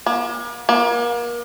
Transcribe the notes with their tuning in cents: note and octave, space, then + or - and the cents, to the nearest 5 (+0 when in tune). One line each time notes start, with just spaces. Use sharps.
A#3 +40
A#3 +35